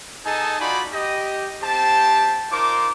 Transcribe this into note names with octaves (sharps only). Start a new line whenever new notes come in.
D#4 G#4 A4 D#5 G#5 A5
D#4 F4 F#4 D5 G#5 B5
G4 D#5
C4 G4 C5 A5
D#4 F4 A#4 C5 D6